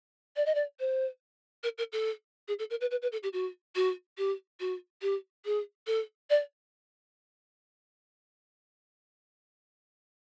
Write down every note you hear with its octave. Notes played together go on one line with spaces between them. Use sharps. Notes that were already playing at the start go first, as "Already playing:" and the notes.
D5
D#5
D5
C5
A#4
A#4
A4
G#4
A4
A#4
B4
B4
B4
A4
G4
F#4
F#4
G4
F#4
G4
G#4
A4
D5